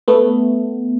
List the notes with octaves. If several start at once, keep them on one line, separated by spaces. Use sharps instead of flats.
A3 B3